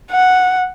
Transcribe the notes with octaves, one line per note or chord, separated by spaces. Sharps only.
F#5